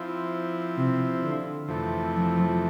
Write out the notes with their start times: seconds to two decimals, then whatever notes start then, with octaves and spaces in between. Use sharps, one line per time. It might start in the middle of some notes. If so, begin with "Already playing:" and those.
Already playing: F3 C4 E4
0.78 C3
1.23 D3
1.68 F2 C3 E3 A3
2.13 F3